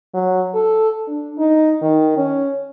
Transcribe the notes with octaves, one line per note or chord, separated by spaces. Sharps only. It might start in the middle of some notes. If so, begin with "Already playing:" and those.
F#3
A4
D4
D#4
D#3
C#4